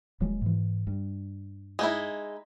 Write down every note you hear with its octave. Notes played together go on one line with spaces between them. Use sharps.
D#1 F#3 G#3
G#2 E3
G2
G#3 D#4 E4